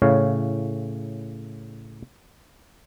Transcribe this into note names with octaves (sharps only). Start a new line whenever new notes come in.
A2 C#3 C#5 F5